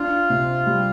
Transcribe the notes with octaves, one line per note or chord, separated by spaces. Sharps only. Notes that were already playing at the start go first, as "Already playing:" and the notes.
Already playing: D4 F4
C3
G3